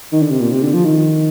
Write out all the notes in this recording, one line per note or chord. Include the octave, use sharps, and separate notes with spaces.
D#3
D3
C3
A#2
C3
D3
F3
D#3